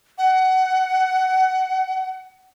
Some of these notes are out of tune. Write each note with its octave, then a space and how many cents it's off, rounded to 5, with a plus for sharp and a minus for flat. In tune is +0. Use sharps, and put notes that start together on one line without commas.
F#5 +20